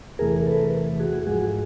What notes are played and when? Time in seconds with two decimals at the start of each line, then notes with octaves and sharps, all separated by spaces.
0.19 E2 C3 E3 A3 G#4 A#4
0.47 A4 B4
1.00 F#4 G#4
1.27 G#2 F3 G#3 F#4 G#4